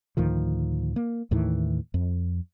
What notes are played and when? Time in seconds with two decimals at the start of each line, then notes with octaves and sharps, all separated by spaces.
0.17 D2 A2 D#3 F3
0.96 A#3
1.31 D#2 A2 D#3 E3
1.94 F2